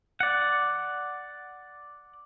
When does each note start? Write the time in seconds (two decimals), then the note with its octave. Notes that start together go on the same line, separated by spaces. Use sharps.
0.20 D5 F#5